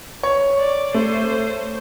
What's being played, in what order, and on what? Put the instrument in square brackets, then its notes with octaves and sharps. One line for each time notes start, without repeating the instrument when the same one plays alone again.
[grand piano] C#5
[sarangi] D5
[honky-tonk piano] A3 [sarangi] C5